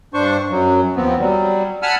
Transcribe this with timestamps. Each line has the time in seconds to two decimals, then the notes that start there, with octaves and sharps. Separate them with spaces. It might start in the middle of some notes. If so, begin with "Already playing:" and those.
0.14 G2 D4 C5 C#6
0.51 F#2 F#3
0.96 D#2 F3 B3 C4
1.19 F#3 G3
1.82 F#5 G#5 A5 B5 E6 F6